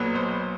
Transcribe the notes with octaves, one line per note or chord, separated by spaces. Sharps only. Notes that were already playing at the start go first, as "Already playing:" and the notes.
Already playing: B1 A#2 F#3 B3
C5